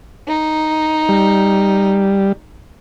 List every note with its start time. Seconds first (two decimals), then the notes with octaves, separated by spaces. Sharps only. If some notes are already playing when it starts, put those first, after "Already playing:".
0.28 D#4
1.09 G3